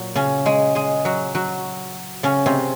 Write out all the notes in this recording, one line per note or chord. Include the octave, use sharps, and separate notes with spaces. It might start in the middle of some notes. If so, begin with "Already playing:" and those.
Already playing: A#2 F#3
C#3 C#4
G#3 G#4
G#3 G#4
F#3 F#4
F#3 F#4
C#3 C#4
C3 C4